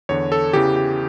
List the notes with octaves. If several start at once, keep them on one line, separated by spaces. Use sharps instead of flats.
E2 D3 C#5
A4
E2 C#3 E3 G4
G4